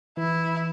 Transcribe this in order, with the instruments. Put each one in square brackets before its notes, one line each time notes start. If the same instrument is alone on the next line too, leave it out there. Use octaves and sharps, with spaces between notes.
[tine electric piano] E3 [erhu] E4